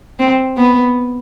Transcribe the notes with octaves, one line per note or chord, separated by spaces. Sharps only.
C4
B3